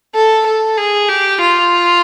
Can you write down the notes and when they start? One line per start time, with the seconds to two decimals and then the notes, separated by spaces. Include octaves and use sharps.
0.15 A4
0.46 A4
0.77 G#4
1.09 G4
1.41 F4